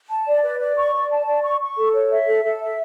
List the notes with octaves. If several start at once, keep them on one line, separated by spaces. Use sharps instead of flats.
A5
D5
B4
D5
C#6
D5
A5
D5
C#6
C#6
A4
C#5
E5
A4
A4
E5